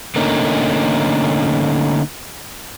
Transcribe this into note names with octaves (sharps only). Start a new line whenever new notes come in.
D3 A3 A#3 C#4 D#4